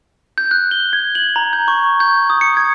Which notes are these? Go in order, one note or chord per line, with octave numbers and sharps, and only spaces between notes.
G6
F#6
G7
G#6
F#7
A#5
G6
C#6
G6
D#6
C#7
G#6